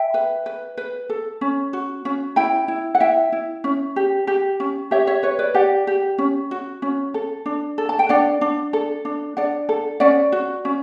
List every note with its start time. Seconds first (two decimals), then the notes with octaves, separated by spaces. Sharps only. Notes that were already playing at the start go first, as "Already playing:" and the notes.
Already playing: E5 G5
0.14 B4
0.46 B4
0.77 B4
1.10 A4
1.41 C#4
1.73 F#4
2.05 C#4
2.36 E4 G5 B5
2.68 E4
2.95 F#5
3.00 E4 E5 G5
3.32 E4
3.64 C#4
3.96 G4
4.27 G4
4.60 C#4
4.91 G4 C#5 E5
5.07 C#5 E5
5.23 B4 C#5
5.39 B4 D5
5.54 G4 D5 F#5
5.87 G4
6.18 C#4
6.51 F#4
6.82 C#4
7.14 A4
7.46 D4
7.78 A4
7.89 A5
7.99 G5
8.09 D4 D5 F#5
8.41 D4
8.73 A4
9.05 D4
9.37 D4 D5 F#5
9.69 A4
10.00 C#4 D5 F#5
10.32 F#4
10.65 C#4